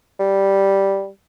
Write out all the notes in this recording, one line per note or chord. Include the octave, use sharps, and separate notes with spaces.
G3